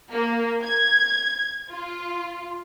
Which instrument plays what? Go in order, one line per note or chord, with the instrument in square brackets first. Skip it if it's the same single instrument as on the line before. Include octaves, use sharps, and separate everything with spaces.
[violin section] A#3
G#6
F4